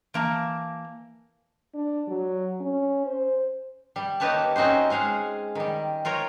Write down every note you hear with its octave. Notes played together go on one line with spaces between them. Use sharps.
E3 A#3 A5
D4
F#3
C#4
C5
G3
A#3 D#4 G4 B4 C#5 A5
C4 C#4 D#4 F#4 C5
G#3 G#4 F5 F#5
D#3 G3
F4 A#4 C#5 G5